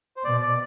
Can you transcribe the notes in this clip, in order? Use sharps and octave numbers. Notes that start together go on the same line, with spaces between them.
C5
B2 D5
D5